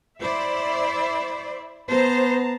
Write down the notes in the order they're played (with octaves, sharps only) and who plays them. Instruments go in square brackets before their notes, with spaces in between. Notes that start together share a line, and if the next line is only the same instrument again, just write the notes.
[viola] E4 E5 [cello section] C5 D5
[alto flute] B3 [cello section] C5 [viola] A5 A#5